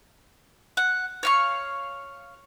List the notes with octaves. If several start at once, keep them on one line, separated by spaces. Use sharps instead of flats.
F#5
C#5 F5 C#6